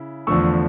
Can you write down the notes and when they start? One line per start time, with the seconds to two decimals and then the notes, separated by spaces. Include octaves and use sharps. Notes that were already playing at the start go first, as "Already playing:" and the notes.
Already playing: C#3 E4
0.27 E2 D3 F3 A3 C#6 E6